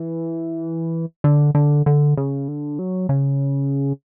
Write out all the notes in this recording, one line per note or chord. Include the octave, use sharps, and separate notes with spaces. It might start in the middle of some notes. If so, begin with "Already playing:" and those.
Already playing: E3
D3
D3
D3
C#3
D3
F#3
C#3